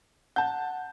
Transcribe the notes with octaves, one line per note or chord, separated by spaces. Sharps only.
F#5 A5 G6